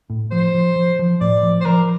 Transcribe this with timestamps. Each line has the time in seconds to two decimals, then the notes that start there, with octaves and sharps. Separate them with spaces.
0.10 A2
0.31 F3 C5
0.55 F3
0.76 F3
0.99 F3
1.21 A2 D5
1.43 F3
1.61 C5
1.65 F3 A#4